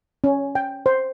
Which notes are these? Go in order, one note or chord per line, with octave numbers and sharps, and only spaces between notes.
C#4
G5
C5